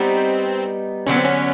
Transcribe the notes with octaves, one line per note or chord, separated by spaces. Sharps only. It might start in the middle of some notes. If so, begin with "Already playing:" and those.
Already playing: G3 B3 C4 D#4
D3 F#3 B3 C#4
C4
C#4